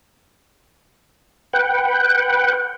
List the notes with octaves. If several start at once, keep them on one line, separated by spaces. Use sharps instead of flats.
B4 F#5 G5